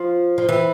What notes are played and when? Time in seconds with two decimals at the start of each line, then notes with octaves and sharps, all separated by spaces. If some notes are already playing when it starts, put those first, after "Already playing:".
Already playing: F3
0.38 F3
0.49 E3